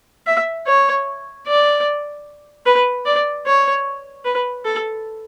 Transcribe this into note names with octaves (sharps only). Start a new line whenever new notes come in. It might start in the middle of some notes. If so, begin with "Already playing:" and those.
E5
C#5
D5
B4
D5
C#5
B4
A4